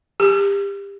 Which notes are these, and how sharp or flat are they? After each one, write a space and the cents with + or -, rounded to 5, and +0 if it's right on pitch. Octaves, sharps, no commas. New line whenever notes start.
G4 +25